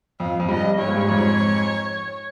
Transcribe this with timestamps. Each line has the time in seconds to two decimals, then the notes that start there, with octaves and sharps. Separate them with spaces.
0.20 F2 F5
0.40 F2
0.49 G2 D#5
0.78 G2 C#5
0.88 G#2
0.97 G2
1.08 F2 G#2